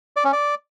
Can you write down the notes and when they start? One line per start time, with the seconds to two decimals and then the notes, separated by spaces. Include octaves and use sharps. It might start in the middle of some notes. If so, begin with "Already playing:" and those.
0.16 D5
0.24 C#4
0.33 D5